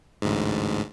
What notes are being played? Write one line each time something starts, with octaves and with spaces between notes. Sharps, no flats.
A1 D2 G#2